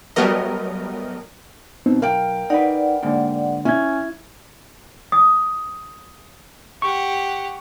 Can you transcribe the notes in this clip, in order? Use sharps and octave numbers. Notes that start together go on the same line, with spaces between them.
F#3 G3 A3 B3 A#4 D#5
B2 B3 C4 D#4
B1 A#4 F5 G5 D7
D#4 B4 D5 F#5
G#2 D3 A#3
C#4 E4 E5 G#6
D#6
G4 F#5 C#6